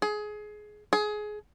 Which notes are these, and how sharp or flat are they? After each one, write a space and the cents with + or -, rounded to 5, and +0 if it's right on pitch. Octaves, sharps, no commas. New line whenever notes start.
G#4 +20
G#4 +20